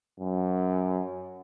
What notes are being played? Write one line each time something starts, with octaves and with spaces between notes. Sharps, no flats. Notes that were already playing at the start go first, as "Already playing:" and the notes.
F#2